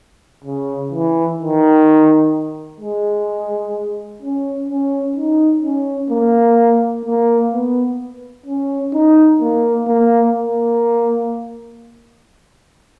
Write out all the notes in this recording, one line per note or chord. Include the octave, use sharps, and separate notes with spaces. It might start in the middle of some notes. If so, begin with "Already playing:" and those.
C#3
E3
D#3
G#3
C#4
C#4
D#4
C#4
A#3
A#3
B3
C#4
D#4
A#3
A#3
A#3